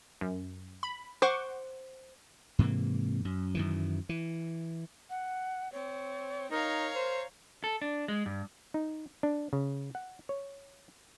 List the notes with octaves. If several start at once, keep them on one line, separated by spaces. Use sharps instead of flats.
F#2
B5
C5 F#5 C#6 D6
G#2 C3 E3 A#3
F#2
F#2 D#3 E3
E3
F#5
C4 C#5
D#4 A#4 C#5 F5 A#5
C5
A4
D4
G#3
G2
D#4
D4
C#3
F#5
C#5